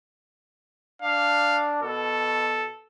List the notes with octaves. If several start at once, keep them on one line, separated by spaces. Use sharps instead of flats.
D4 F5
B2 A4